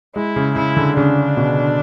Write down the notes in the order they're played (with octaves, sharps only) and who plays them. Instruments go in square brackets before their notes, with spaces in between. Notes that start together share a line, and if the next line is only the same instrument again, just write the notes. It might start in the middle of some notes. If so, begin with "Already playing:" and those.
[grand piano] G#3 [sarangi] E4
[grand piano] C#3
[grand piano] C#3 [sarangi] E4
[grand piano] D3
[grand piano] C#3 [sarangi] D4
[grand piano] B2